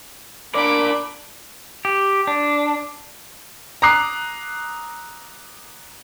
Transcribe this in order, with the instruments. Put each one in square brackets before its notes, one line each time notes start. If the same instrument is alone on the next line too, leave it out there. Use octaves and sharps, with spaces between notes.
[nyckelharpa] D4 B5 [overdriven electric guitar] A#4 D5 [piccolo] D6
[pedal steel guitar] G4
D4
[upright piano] A#5 D6 D#6 F#6 C7